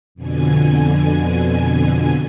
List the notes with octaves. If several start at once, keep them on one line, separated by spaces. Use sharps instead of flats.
F2 B2 D3 G#5